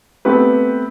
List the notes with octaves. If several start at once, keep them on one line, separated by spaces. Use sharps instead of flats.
A3 B3 C4 G4 B4